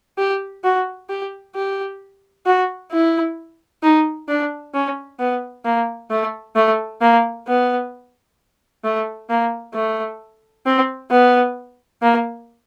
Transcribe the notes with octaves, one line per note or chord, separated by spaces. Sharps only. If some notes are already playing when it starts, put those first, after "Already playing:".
G4
F#4
G4
G4
F#4
E4
D#4
D4
C#4
B3
A#3
A3
A3
A#3
B3
A3
A#3
A3
C4
B3
A#3